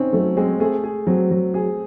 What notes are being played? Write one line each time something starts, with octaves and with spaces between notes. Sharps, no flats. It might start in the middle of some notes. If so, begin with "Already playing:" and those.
Already playing: C4 C#4 D#4
F#3 A3
G#3 C4
A3 G#4
G#4
F#3 C4
F#3
G#4